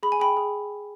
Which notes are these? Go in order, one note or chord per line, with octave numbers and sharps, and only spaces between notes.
G#4 B5
G#5
G#4 G5 B5
G#4